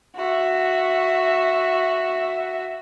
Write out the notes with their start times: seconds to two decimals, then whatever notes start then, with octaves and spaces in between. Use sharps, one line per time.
0.15 F#4 E5